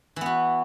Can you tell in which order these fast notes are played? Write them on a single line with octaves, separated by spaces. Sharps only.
E3 B3 F#4